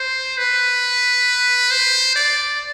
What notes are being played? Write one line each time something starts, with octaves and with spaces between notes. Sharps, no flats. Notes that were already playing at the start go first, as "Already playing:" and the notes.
Already playing: C5
B4
C5
D5